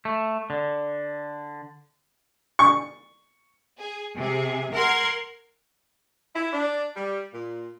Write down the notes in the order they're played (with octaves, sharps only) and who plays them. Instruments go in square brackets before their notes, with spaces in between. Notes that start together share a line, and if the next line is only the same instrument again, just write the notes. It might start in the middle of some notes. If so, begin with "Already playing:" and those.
[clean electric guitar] A3
D3
[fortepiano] C#6
[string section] G#4
C3 G#4
A#4 F#5 C6 G#6
[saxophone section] E4
D4
G3
A#2